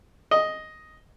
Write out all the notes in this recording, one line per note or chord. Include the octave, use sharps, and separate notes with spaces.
D#5